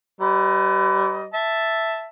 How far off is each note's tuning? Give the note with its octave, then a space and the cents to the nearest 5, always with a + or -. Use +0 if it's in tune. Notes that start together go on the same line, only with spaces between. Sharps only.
G3 -30 B4 +30 D#5 +10
E5 +0 A5 +0